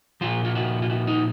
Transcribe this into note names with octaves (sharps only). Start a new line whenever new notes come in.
A#2 F3 F4
F4
F#4
F4
F#4
D#4